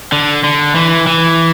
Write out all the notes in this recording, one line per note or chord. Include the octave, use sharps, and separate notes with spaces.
D3
D3
E3
E3